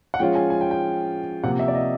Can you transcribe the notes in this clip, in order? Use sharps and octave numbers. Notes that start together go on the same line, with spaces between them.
F#5
F3 G#3 C#4 F4 G5
G#5
G#5
G5
G5
C3 F3 A#3 F#5
E5
D5
D#5